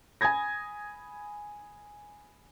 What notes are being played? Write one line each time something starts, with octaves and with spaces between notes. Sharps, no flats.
G#5 B5 D#6 G#6 A#6